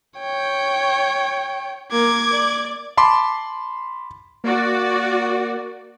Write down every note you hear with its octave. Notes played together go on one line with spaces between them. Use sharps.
C#5 G5
A#3 D6 G#6
D5
A5 B5 C6 D6
A#3 F#4 D5